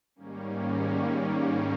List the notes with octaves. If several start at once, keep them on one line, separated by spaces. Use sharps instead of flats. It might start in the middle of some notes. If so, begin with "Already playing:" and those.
G#2 D#3 G3 A#3 C#4